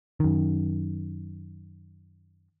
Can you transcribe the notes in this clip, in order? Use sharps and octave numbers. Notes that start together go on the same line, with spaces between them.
F#2 D#3